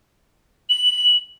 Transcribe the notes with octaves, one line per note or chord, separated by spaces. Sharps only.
F#7